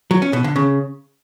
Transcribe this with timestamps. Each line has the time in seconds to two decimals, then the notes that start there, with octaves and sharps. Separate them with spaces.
0.11 F#3
0.22 C#4
0.33 B2
0.44 D3
0.56 C#3